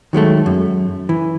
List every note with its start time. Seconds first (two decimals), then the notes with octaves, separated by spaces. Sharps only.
0.13 D#3 F#3 G#3 A3
0.46 F#2
1.09 E3